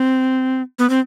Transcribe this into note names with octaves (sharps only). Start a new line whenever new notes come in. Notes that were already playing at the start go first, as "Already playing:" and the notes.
Already playing: C4
B3
C4